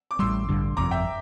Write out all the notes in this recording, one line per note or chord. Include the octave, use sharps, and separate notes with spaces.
D6
A1 A2 G3 C6 E6
A1 G2 D3
G1 F2 C3 A#5 D6
E5 G5